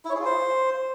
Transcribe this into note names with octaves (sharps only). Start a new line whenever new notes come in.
E4
C#5
G#4
F4
C5